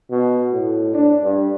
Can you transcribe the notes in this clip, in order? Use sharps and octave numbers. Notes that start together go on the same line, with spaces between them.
B2
A2
D4
G2